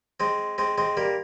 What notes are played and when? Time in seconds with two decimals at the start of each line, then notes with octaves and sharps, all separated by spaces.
0.20 G#3 C4
0.58 G#3 C4
0.78 G#3 C4
0.97 G3 A#3